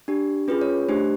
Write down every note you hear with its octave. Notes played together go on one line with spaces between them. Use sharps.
D4 G4
C#4 F4 G#4 B4
C#5
A3 D4 G4 C5